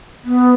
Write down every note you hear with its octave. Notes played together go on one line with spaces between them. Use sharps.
B3